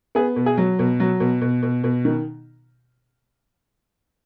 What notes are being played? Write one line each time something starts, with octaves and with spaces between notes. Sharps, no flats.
B3 G#4
B2
G#4
F#3
B2
F#3
B2
B2
B2
B2
D#3